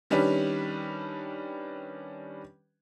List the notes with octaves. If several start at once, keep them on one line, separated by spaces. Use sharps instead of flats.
D#3 G3 C#4 D4 B4